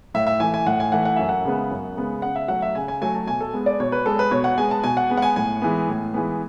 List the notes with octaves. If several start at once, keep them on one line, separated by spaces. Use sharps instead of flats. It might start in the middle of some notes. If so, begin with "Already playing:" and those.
A2 E5
E5
E3 A3 G#5
G#5
A2 F#5
G#5
E3 A3 F#5
F#5
F#2 E5
F#5
C#3 G#3 B3
F#2
C#3 G#3 B3
C#3 F#5
E5
F#3 A3 F#5
E5
C#3 G#5
G#5
F#3 A3 G#5
A5
B2 G#5
A4
G#3 B3
D5
B2 C#5
B4
G#3 B3 A4
B4
B2 C#5
F#5
G#3 B3 G#5
A5
B2 G#5
F#5
G#3 B3
F#5
G#5
A2 G#5
E3 G#3 B3
A2
E3 G#3 B3